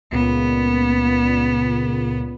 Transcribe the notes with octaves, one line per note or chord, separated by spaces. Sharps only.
C#2 A#2 B3